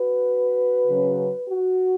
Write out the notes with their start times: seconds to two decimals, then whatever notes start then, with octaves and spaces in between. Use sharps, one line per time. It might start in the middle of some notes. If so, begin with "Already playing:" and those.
Already playing: F#4 B4
0.86 C#3 F#3 C#4
1.49 F#4